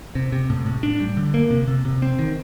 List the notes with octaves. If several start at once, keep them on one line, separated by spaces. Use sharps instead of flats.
C3
C3
A2
A2
D4
G3
D3
A#3
C3
C3
C3
C4
D#3